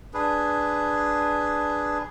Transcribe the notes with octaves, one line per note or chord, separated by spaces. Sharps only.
D4 G#4 B4